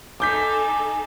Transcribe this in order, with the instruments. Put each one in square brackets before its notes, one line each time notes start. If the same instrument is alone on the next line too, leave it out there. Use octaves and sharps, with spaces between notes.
[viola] D#4 A4 [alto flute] G#5 [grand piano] D6 G6 B6